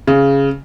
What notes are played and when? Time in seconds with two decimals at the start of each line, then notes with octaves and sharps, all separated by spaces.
0.07 C#3